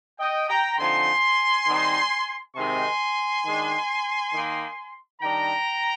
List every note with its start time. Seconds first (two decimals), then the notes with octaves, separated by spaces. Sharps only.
0.19 D#5 G5
0.49 G5 A#5
0.79 D3 F3 C4 D#4 G#5 C6
1.67 D#3 G3 C4 D#4
2.56 C3 D#3 G#3 C4 D#4 G#5 C6
3.45 D#3 G#3 D4
4.33 D#3 A#3 D#4
5.21 D#3 G3 D4 G5 A#5